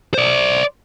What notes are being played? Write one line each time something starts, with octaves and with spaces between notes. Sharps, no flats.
C5 D5